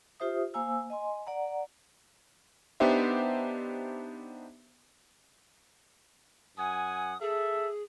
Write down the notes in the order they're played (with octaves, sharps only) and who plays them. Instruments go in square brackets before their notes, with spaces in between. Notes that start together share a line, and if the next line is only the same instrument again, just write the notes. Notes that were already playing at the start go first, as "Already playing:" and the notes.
[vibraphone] F4 G4 C5 E5 D#6
A#3 C5 F5 G#5 A#5 E6
D#5 G#5 C6
D5 F#5 A#5
[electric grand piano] B3 D4 D#4 G4 C5 E5
[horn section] F#2 F#5 G#5 [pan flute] D#6
[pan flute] G#4 [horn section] A4 E5